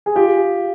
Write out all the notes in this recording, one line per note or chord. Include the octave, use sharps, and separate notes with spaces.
G#4
F4 G4